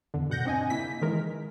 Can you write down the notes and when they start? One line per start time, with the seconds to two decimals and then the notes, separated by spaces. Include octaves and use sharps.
0.14 E2 D3
0.30 G2 B2 F#5 G6 A#6
0.45 C4 D4 D#5 G#5
0.70 C#3 A#3 E4 B6
1.02 D#3 E3 G#3 A#4